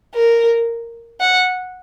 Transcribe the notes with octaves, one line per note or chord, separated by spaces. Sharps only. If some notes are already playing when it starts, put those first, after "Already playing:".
A#4
F#5